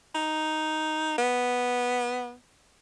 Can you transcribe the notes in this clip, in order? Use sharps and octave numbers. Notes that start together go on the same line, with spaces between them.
D#4
B3